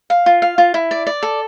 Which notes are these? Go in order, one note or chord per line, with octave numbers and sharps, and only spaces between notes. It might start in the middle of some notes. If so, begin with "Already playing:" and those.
F5
F4
F5
F4
E4
D5
D5
A4